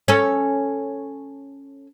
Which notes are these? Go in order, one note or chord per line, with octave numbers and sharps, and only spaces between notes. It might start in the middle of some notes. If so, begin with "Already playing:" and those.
C#4 A4